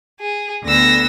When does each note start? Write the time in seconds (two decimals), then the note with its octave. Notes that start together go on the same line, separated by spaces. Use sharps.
0.19 G#4
0.63 D2 D3 B3 E6 A#6